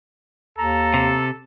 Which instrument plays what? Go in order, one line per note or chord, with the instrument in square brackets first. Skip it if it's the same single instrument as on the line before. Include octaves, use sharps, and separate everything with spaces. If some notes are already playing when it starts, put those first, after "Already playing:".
[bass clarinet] D#2 [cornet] A4 [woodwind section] A#5
[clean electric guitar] C3